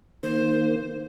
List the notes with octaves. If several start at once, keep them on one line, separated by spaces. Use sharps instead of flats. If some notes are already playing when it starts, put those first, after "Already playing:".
D#3 A#3 C5